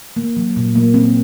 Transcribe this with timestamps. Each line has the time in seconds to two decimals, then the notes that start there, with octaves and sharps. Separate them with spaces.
0.16 A#3
0.37 F#3
0.56 A#2
0.75 A#3
0.94 C4